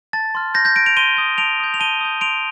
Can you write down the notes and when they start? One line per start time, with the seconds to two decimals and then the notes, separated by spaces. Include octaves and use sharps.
0.13 A5 A6
0.35 C6 F6
0.54 C6 G6 A#6
0.65 G6 A#6
0.76 F6 A#6 D7
0.86 D7 F7
0.97 C6 D#7 G7
1.17 D#6 G6
1.38 A5 D7 F7
1.60 D#6 G6
1.74 F7
1.80 A5 D#7 G7
2.01 D#6 G6
2.21 C6 D7 F7